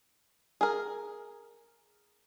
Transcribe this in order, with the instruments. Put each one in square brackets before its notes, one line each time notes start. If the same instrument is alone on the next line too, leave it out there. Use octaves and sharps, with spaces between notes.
[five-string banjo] G#4 A#4